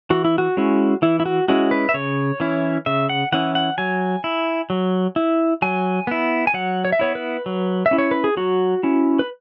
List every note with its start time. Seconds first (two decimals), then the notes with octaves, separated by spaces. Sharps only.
0.10 E3 F#4
0.25 E4
0.38 F#4
0.57 G#3 C#4 E4
1.02 E3 E4
1.20 E4
1.26 F#4
1.48 G#3 C#4 E4 F#4
1.71 B4
1.89 E5
1.94 C#3 C#5
2.40 E3 C#4 E4
2.86 C#3 E5
3.09 F#5
3.32 E3 C#4 E4 F#5
3.55 F#5
3.78 F#3 G#5
4.24 E4
4.70 F#3
5.16 E4
5.62 F#3 G#5
6.07 B3 E4
6.47 G#5
6.54 F#3 F#5
6.85 C#5
6.92 E5
6.99 B3 E4 C#5
7.15 B4
7.46 F#3
7.86 E5
7.91 C#4 E4
7.98 C#5
8.11 B4
8.24 G#4
8.37 F#3 F#4
8.83 C#4 E4
9.19 B4